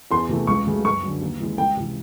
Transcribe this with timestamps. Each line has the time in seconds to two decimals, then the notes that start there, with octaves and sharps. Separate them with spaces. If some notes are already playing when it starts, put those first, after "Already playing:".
0.11 E2 C6
0.29 C3 E3 A3
0.47 C#2 C#6
0.67 C#3 F#3 A3
0.84 F#2 C#6
1.03 D3 F#3
1.22 D#2
1.40 C#3 E3 G#3
1.58 C#2 G5
1.77 C3 E3